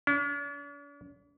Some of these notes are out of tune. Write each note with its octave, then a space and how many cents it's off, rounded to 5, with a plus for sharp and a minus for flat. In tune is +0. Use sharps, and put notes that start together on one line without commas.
D4 -45